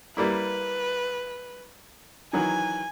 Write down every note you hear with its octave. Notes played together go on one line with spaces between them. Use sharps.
G3 A#3 E4 B4
D#3 E3 F#3 G#5